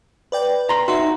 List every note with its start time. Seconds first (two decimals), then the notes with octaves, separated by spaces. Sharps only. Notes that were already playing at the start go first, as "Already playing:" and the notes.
0.32 B4 D5 G5
0.69 A#5 C6
0.88 D#4 F#4 E5 C6